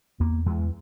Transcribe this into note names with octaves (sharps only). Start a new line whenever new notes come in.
E2 A#3
E2 G#3